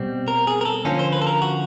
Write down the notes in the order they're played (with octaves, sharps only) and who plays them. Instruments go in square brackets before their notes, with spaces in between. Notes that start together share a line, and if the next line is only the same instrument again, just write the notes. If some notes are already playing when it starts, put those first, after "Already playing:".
Already playing: [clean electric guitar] B2 G3 C4
A#4
G#4
A#4
A4
D3 F3 A#3 C#4
C5
B4
A4
A#4
F#4